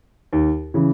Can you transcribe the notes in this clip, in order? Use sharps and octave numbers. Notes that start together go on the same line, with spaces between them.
D#2
C#3 E3